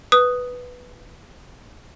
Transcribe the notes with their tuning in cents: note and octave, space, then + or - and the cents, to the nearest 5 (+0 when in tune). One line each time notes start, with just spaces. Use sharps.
B4 +0 D#6 +0